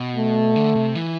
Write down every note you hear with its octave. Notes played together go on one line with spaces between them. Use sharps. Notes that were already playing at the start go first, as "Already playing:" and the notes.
Already playing: B2
A3
D3
C3
E3